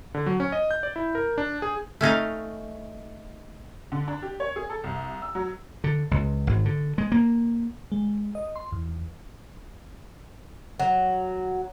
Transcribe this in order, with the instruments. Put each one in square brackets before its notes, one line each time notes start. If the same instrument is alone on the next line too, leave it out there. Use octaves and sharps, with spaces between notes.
[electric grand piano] D3
F#3
C#4
D#5
G6
D5
E4
A#4
D4
G#4
[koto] A3 C#4 D#4 F5
[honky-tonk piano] D3
D4
G4
C#5
G#4
A4
C2
E6
F#3
[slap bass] D3
C#2
G#1
D3
G#3
A#3
[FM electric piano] G#3
D#5
C6
E2
[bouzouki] F#3